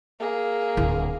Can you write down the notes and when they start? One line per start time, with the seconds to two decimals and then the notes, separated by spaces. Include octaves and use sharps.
0.20 A#3 G#4
0.77 D1 E4